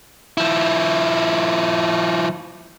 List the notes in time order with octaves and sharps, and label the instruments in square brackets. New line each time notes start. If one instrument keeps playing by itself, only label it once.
[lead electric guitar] F3 E4